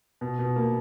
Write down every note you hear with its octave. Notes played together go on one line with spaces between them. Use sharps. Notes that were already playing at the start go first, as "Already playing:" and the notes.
B2
B2
A#3